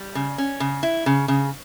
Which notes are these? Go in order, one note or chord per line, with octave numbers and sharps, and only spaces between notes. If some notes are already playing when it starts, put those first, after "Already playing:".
Already playing: G3
C#3
C#4
C#3
E4
C#3
C#3